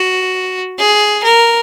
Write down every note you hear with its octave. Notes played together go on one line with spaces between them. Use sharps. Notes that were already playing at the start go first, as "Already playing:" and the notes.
Already playing: F#4
G#4
A#4